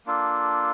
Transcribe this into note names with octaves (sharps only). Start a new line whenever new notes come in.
A#3 D4 F4 A4